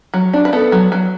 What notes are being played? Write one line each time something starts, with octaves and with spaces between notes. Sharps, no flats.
F#3
D4
B4
B3 A4
F#3
F#3